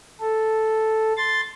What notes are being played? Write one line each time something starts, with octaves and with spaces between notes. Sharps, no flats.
A4
C6 A6